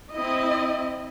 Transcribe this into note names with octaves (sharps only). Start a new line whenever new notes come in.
C4 E4 D#5